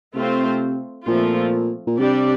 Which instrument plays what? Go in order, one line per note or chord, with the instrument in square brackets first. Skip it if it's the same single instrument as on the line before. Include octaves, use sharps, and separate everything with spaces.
[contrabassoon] C3 [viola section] A3 C4 F4 C5
[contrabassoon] A#2 [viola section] F3 A3 C4 F4
[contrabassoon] A#2
[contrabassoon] C3 [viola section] G3 D4 G4 D5